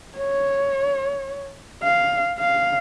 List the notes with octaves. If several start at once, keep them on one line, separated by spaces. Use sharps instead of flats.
C#5
F5
F5